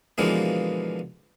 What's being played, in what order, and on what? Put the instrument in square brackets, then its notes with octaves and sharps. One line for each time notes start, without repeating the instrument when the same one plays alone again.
[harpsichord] B2 D3 E3 F3 G#3 A#3